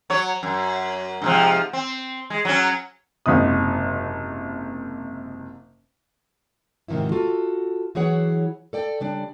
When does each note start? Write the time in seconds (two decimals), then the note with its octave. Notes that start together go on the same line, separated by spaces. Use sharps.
0.10 F#3 C#5
0.43 F#2
1.22 G#2 C3 F3
1.73 C4
2.30 G#3
2.45 F#3 C#4
3.26 F#1 G#2 C3 D#6
6.88 G#2 C3 D#3 F3 E4
7.12 F4 F#4 A4
7.95 E3 F#3 E4 G#4 C#5 F#5
8.73 A4 D5 G5
9.00 C#3 G3 D4